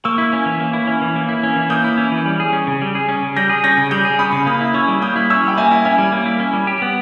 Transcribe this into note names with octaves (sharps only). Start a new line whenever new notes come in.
A#3 C#6 E6
E4
C#4
E3
A#3
E4
C#4
E3
A#3
E4
C#4
E3
A#3 D#6 G6
E4
C#4
E3
G3
G#4
C#4
C#3
G3
G#4
C#4
C#3
G3 G6 A#6
G#4
C#4 G6 A#6
C#3
G3 D#6 G6
G#4
C#4 B5 D#6
C#3
A#3 B5 D#6
E4
C#4 C#6 E6
G3
A#3 D#6 G6
E4
C#4 C#6 E6
G3 G5
A#3 E5 G#5
E4
C#4 E5 G#5
G3
A#3
E4
C#4
G3
G4
B3